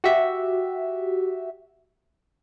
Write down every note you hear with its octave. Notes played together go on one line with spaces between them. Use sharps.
F#4 G4 E5